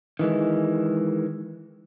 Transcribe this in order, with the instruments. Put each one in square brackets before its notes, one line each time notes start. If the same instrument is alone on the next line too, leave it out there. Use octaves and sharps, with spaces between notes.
[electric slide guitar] D#3 E3 G#3